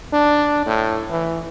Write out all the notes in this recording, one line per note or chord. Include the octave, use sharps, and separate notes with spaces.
D4
A2
E3